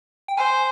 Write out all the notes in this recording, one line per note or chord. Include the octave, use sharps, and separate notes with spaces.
G5
C5 G#5